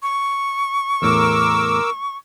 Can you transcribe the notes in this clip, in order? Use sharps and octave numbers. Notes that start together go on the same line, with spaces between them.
C#6
E2 A2 A#4 D6 E6